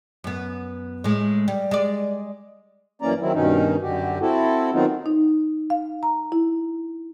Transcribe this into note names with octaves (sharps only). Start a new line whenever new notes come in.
F#2 B3
A2 G#3
G3
G#3 D5
F#2 E3 A#3 C#4 D5 A#5
D#3 F#3 C4 E4
G2 B2 D#3 C#4 D#4
F#2 D3 F#4 G4
C4 E4 F#4 A4
D#3 F#3 B3 C4 D#4 F4
D#4
F5
A#5
E4